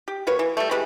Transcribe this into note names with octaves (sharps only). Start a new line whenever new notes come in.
G4
A#3 F#4 B4 C#5
E3
G3 A3
E3 G#3 G4 B5